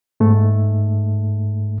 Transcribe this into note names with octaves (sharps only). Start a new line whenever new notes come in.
G#2 A3